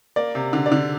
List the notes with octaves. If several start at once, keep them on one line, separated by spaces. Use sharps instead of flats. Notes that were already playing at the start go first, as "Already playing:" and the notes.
A#3 D5
C3
D3
D5
D3